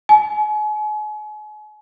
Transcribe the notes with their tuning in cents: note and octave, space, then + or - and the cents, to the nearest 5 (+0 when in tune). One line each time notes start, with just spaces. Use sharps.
G#5 +40